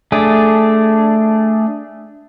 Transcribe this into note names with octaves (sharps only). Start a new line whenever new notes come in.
A3 D4 G#4